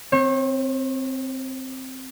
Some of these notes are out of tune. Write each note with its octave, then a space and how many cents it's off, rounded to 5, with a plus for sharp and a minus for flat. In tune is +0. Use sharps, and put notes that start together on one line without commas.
C4 +0 C#5 -40